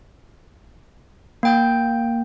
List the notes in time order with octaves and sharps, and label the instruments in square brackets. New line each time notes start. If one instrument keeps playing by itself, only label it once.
[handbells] A#3 G5 G6